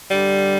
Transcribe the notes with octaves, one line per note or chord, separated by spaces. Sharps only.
G2 D3 G3